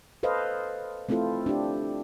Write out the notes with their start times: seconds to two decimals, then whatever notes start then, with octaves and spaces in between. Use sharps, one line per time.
0.23 A4 B4 C5 D#5 F5
1.09 A3 C4 E4 F4 A4 C5
1.46 D4 G4